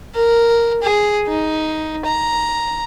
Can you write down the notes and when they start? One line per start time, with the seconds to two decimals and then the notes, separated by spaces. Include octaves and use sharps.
0.14 A#4
0.82 G#4
1.27 D#4
2.05 A#5